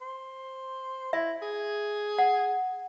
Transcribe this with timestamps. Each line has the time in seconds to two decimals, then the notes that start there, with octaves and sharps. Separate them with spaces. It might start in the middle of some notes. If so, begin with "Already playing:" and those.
0.01 C5
1.13 E4 E5
1.42 G#4
2.18 F#5